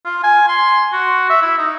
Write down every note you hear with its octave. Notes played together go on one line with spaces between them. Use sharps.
F4
G#5
C6
F#4
E5
E4
D#4